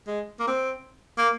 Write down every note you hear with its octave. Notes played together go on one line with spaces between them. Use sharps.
G#3
A#3
C4
A#3